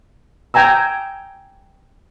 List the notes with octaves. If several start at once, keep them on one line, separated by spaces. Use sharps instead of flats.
G5 G#5 A#5 E6